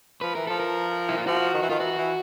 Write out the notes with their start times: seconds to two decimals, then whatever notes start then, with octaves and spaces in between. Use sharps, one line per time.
0.21 F3 B4
0.35 E3 A#4
0.47 F3 A4
0.60 A#4
1.09 E4
1.18 F4
1.27 F3 F#4
1.54 D#3
1.62 E3
1.70 D#3 F4
1.80 E3 F#4
1.98 E3